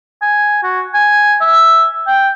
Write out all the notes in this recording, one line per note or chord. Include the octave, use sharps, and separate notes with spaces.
G#5
F#4
G#5
E5
G5